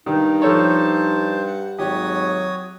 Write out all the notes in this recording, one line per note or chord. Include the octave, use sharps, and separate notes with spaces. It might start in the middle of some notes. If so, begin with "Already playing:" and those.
G2 D#3 D#4
F3 A4 C5 C#5 A5
F#5
G#1 F#3 F#4 G4 C#5 D#6